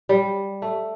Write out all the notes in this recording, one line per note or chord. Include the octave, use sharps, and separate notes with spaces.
G3
A3